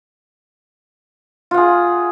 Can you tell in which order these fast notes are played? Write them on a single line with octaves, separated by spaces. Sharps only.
F4 F#5 G#4